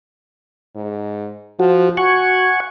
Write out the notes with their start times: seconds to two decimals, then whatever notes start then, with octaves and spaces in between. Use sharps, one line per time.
0.76 G#2
1.60 F3 F#4
1.97 F#4 F#5 G#5 C#6